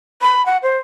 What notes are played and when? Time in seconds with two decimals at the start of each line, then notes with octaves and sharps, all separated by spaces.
0.22 B5
0.46 F#5
0.63 C5